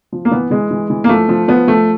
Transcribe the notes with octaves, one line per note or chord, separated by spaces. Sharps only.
F3
A#3
E3 B3
E3 G#3
E3
E3
A#3
F3 A3
F3
F3 B3
F3 A3